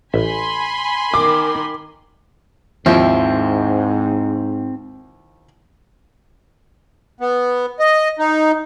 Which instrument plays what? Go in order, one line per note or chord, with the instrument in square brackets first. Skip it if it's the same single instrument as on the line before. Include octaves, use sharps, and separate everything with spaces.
[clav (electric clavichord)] A1 E5 [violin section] G#5 B5 C6
[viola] D#3 A#4 [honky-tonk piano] D6
[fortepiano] D#2 F3 [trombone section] G#2 [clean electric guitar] C4 [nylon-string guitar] E4
[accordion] B3
D#5
D#4